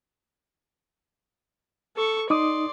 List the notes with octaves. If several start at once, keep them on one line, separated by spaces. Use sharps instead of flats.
A4 C#6
D#4 D5 C6 D6 D#6